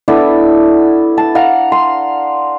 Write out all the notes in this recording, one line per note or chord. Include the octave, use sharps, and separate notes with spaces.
B3 D4 E4 A4
A5
F5 F#5 A#5
C6